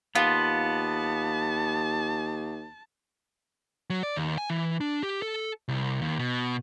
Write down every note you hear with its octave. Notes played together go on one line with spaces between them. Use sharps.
D#2 B3 F4 A5
F#3
D5
D#2
G#5
E3
D4
G4
A4
C2
D#2
B2